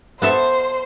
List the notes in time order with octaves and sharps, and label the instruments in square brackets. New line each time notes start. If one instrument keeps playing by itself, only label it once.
[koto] B3 A4 E5 [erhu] C5